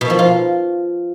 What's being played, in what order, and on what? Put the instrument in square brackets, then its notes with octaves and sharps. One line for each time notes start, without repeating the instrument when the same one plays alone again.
[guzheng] B2
F3
F4